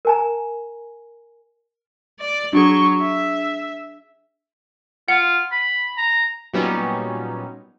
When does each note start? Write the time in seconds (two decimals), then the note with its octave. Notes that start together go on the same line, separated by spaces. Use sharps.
0.05 A#4 G#5 A#5
2.20 D5
2.53 F#3 D4 G#4 C#6
3.01 E5
5.08 F4 F#5
5.52 B5
5.97 A#5
6.53 A#2 F#3 G3 B3 C#4 D#4